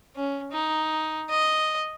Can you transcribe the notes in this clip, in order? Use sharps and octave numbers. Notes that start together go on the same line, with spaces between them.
C#4
D#4
D#5